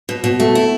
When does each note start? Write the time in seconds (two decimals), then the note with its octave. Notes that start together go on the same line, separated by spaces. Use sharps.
0.09 B2
0.24 B2
0.40 A3
0.55 E4